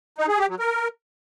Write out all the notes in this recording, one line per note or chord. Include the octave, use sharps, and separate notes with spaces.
D#4
G#4
G4
F#3
A#4